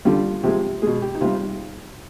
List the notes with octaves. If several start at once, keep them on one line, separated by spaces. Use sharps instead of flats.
D3 G3 F4
C3 F3 G#3 G4
B2 G#3 G#4
G4
D#4
C3 G3 F4